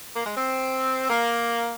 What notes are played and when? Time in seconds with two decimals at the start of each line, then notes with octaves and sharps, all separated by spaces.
0.16 A#3
0.25 G#3
0.36 C4
1.09 A#3